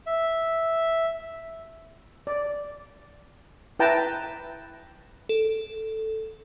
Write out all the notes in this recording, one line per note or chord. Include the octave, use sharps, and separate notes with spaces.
E5
D5
E4 B4 G5 A5 A#5
A4